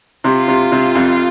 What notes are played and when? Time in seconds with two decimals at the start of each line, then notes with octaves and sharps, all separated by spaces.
0.24 C3 F4
0.48 C3
0.72 C3
0.95 F2